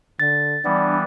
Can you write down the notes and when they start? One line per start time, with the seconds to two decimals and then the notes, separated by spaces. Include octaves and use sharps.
0.20 D3 A6
0.65 E3 G3 B3 D4